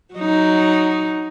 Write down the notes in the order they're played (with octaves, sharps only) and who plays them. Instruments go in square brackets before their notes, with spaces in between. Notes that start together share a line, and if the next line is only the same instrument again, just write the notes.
[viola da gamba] F#3 D#4